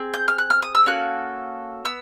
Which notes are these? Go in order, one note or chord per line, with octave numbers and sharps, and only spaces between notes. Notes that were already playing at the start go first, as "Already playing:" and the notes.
Already playing: C4 G#4
G6
F6
F#6
F6
D#6
E6
A#3 C#4 F#4 A4 F#6
B3 E6